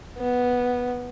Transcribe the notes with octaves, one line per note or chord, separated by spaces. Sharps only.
B3